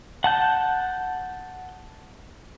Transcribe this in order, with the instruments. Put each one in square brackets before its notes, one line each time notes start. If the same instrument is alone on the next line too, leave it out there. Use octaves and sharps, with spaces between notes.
[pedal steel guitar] F#5 A5 G6